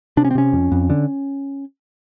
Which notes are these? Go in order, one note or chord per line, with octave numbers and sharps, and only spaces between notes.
C3 D4
C#4
C4
C3 C#4
F2
F2
D3